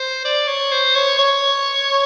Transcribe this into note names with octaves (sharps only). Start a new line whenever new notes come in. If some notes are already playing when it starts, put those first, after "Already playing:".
Already playing: C5
D5
C#5
C5
C#5
C#5